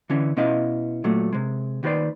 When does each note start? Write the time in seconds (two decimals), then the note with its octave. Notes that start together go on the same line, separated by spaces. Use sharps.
0.10 D3 E3 C#4
0.37 B2 C#4 E4 D#5 F5
1.04 A#2 F#3 A3
1.33 C3 G#3
1.83 D#2 D#3 F#4 B4 C5 D5